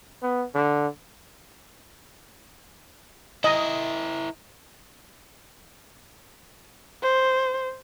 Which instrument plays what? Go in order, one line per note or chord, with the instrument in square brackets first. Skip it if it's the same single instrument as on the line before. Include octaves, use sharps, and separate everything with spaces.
[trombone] B3
D3
[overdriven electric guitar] E4 A#4 [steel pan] D#5
[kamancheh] C5